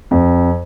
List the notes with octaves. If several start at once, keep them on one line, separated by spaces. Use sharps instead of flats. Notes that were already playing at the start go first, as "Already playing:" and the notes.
F2